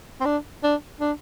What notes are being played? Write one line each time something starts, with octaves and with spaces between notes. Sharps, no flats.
C4
D4
D4
D4